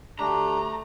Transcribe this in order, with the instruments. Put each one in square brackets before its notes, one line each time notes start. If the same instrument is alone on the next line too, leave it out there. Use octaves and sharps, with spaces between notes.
[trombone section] D2 G4 [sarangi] A3 [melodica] D4 [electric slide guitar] A#5